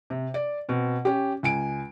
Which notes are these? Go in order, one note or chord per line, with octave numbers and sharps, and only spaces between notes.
C3
D5
B2 C4
C#4 G4
C#2 G#5 D7